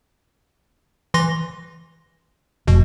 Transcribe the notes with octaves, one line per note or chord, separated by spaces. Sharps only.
E3 C6 A#6
F1 B2